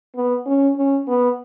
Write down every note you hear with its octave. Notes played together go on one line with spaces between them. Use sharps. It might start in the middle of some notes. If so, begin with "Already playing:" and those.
B3
C#4
C#4
B3